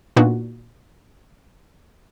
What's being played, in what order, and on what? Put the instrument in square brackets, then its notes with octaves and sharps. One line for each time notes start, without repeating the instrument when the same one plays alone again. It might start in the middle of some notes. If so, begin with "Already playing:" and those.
[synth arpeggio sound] A#2 B3 D4 D#4 F#4